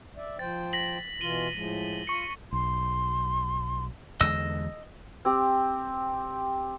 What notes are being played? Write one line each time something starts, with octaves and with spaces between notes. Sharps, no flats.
D5 E5
F3 C5 G5 A6
A#6 B6 F#7
B2 E3 F4 D#7 G7
A2 F3 G#3
F4 C#6 C#7
B1 C6
E2 D3 G#3 D#5 E6
C4 G4